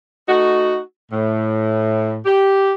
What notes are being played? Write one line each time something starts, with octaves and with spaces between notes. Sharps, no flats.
A3 D#4 F#4
A2
G4